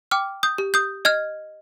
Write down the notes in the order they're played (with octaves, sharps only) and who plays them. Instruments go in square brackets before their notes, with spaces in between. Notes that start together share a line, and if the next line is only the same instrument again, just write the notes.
[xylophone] G5 D6 F6
D#6 G6
G4
D#6 G6
D#5 F6 G#6